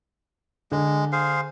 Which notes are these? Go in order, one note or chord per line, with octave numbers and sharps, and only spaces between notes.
D3 G#3
G#4 C5 F5